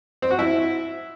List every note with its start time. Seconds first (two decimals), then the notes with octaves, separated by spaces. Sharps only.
0.22 C4
0.31 F#4
0.39 E4